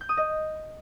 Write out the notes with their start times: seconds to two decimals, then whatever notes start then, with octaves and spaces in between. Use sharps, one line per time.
0.01 G6
0.09 D#6
0.17 D#5